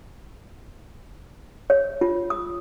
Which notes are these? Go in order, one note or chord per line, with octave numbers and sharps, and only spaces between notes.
C#5
F4
D#6